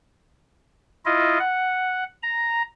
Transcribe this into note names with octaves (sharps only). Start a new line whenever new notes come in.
E4 F4 D#5
F#5
A#5